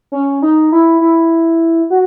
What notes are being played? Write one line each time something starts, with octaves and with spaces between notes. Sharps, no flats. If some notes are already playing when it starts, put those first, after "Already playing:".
C#4
D#4
E4
E4
F#4